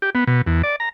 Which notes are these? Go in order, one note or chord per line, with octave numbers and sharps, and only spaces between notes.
G4
B3
B2
E2
D5
A#5